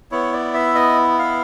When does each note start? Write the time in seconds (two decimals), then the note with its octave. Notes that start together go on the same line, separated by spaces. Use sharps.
0.12 B3 E4 C#5
0.33 D5
0.54 E5
0.75 D#5
1.19 F5